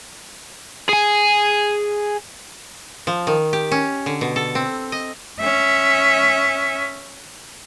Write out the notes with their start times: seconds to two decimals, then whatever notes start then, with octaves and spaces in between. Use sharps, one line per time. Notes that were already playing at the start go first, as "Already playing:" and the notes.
0.89 G#4 G#5
3.07 F3
3.27 D#3
3.53 G4
3.71 C#4
4.06 D3
4.21 B2
4.36 A4
4.55 C4
4.92 D#5
5.40 C#4 E5